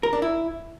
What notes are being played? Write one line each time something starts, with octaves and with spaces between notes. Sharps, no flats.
A#4
D4
E4